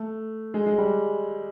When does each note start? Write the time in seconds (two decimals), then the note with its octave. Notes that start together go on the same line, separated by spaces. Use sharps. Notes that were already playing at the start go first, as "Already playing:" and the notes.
Already playing: A3
0.54 G#3
0.66 G#3
0.78 G3